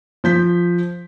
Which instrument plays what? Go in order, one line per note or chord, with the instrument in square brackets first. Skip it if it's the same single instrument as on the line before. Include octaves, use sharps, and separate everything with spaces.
[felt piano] F3 G6 B6